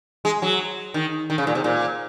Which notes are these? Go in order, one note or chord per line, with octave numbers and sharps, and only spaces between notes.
G#3
F#3
D#3
D#3
C#3
A#2
C3
A#2